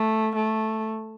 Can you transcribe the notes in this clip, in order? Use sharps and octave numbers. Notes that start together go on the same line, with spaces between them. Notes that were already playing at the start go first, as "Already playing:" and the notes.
Already playing: A3
A3